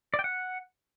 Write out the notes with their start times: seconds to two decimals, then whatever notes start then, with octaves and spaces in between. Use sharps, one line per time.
0.14 D5
0.19 G5
0.24 F#5